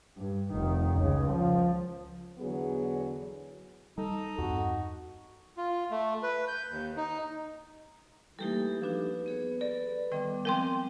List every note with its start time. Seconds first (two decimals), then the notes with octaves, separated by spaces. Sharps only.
0.17 G2
0.51 F1 D#3
0.98 C#2 C#3
1.31 F3
2.39 E2 D3 F#3 B3 G#4
3.98 G3 D#4 A4
4.38 E2 G2 C4 F#4
5.57 F4
5.91 A3
6.23 B4
6.48 G6
6.71 D#2
6.97 D#4
8.39 E3 G3 A3 A#3 D#4 G4 A4
8.82 F3 D4 F#4 B4
9.26 B3 G#4 C#5
9.61 A4 D5
10.12 D#3 G3 B3 D#5 G5 D6
10.45 F3 G#3 C4 A#4 G5 C6